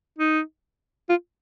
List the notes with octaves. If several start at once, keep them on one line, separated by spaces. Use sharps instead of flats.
D#4
F4